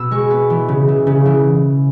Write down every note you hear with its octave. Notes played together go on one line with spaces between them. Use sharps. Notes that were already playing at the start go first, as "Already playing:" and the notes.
Already playing: B2 B3 E6
G#3 C#6
B3
E3
C#3
E3
C#3
E3